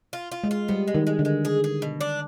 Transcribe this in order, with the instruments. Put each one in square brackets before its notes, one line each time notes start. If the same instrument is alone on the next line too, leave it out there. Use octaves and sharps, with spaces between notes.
[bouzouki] F4
F4
[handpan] G#3
[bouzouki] F4
[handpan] G3 [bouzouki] B3
[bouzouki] G#3
[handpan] D#3
[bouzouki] G#3
[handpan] D3
[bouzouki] G#3
G#4
G#4
B2
D4